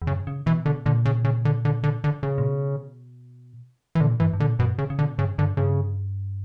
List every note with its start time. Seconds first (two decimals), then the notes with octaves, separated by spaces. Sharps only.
0.02 E2
0.07 F#2 C#3
0.27 C#3
0.46 B2 E3
0.66 B2 D3
0.86 A#2 D3
1.05 C#3
1.25 C#3
1.45 D3
1.65 D3
1.84 D3
2.04 D3
2.23 C#3
2.38 A#2
2.43 B2
3.95 E3
4.00 A#2 D3
4.20 G2 E3
4.33 G2
4.40 A#2 D3
4.59 F#2 B2
4.78 C#3
4.90 C#3
4.99 B2 D3
5.18 G2 C#3
5.38 G2 D3
5.57 G2 C#3